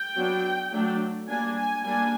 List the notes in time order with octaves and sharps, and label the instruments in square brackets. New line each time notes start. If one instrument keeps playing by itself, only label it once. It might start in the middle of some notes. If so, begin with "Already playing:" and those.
Already playing: [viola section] G5
F#3 B3 D4
F#3 A3 D4
G3 A#3 D4 G#5
G#5
G3 A#3 D4 G#5